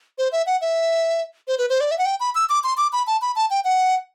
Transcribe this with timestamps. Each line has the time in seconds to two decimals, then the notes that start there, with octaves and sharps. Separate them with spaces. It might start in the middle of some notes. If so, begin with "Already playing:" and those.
0.18 C5
0.32 E5
0.46 F#5
0.61 E5
1.48 C5
1.58 B4
1.70 C5
1.81 D5
1.91 E5
1.98 F#5
2.05 G5
2.20 B5
2.35 E6
2.49 D6
2.64 C6
2.77 D6
2.93 B5
3.07 A5
3.22 B5
3.36 A5
3.50 G5
3.64 F#5